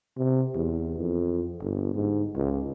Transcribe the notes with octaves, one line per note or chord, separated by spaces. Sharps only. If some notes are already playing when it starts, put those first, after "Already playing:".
C3
E2
F2
G1
G#2
C#2